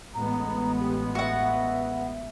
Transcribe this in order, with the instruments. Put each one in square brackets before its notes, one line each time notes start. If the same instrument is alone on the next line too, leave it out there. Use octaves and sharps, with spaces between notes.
[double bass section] A1 G#3 B3 [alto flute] A#5
[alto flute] G4
[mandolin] F#4 F#5 [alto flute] E5